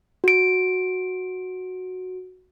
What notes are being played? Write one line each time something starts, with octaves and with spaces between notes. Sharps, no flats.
F#4 D7